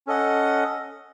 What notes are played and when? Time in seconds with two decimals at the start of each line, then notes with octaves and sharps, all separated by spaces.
0.07 C#4 A4 D#5 F#5